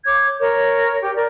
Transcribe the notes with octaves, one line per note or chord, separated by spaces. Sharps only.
C#5 D6 G6 G#6
A#4 C#5
G4
A#4 D5